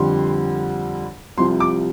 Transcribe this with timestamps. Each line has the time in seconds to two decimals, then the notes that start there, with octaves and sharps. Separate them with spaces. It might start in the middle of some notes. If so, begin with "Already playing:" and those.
Already playing: F2 D3 G3 C6
1.38 C2 C3 F3 C6
1.60 D6